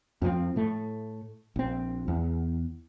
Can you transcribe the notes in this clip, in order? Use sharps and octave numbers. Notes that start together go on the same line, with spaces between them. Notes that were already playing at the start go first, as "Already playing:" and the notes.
F2 F3 A3 C4
A2 A3
A#1 C4
E2